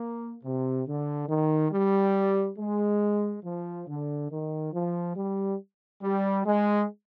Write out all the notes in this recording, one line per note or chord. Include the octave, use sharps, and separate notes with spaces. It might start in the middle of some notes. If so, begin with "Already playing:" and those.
Already playing: A#3
C3
D3
D#3
G3
G#3
F3
D3
D#3
F3
G3
G3
G#3